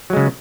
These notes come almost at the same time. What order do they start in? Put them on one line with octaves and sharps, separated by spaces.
F#3 G#3 C#3